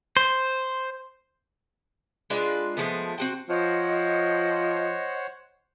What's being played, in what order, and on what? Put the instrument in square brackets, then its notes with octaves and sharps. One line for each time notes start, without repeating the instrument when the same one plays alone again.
[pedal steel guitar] C5
[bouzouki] G#3 D4 F4 B4
F3 G#3 A3 B3
C4 F#4 G5
[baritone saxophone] F3 [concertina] C5 C#5 F#5 [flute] D#5